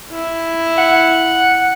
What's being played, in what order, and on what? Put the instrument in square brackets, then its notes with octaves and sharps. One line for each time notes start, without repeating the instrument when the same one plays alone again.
[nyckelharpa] E4
[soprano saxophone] F#5